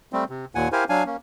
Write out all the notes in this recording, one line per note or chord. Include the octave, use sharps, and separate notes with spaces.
G3 A3 C4
C3
D#2 A#2 F#5 G#5
E4 G4 A#4 C5 F5 G#5
F#3 D4 F5 G#5
A#3 C#4